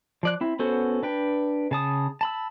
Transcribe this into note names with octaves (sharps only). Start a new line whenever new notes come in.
F3 D5 F#6
C4 E4
B3 C#4 F#4 A4 C5
D4 B4 G5
C#3 A5 D#6
A5 B5 E6